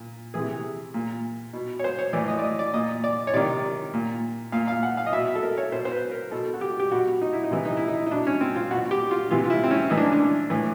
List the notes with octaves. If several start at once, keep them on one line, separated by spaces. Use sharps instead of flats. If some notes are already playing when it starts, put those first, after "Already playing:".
Already playing: A#2
C3 E3 G#4
A#2
B2
C#5
C5
C#5
A2 E3 D5
D#5
D5
D#5
D5
A#2 D#5
D5
C#5
C3 D#3 D5
A#2
A#2 F5
F5
F#5
F5
D#5
B2 E5
E5
A4
A#4
C#5
B2 C5
C5
B4
A#4
B2 A4
F#4
G4
G4
B2 F#4
D#4
E4
D#4
C3 E3 E4
D#4
E4
D#4
D#4
B2 D4
C#4
C4
F4
B2 F#4
G4
F4
C3 E3 F4
F4
E4
C4
C#4
A2 E3 D#4
D4
C#4
D4
A2 E3